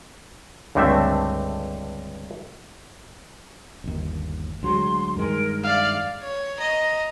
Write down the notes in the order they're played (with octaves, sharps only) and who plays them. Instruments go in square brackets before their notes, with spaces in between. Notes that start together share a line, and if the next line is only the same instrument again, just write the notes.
[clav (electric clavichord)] C#2 G2 D3 A3 C4 E5
[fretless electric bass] G1 D#2
[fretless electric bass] D2 F#3 G#3 [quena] C6
[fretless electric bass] G2 D#3 G#3 [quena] A#4
[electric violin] D5 F5 [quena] E5
[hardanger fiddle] C#5
D#5 A#5